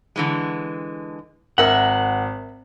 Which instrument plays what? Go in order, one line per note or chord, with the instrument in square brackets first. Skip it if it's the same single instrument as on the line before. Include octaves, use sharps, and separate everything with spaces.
[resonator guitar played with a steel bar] D3 E3 G#3
[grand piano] G#1 F#7 [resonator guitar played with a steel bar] A#4 E5 [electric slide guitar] F#5